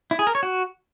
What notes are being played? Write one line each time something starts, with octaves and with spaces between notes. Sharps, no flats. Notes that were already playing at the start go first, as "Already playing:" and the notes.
E4
G#4
A#4
C#5
F#4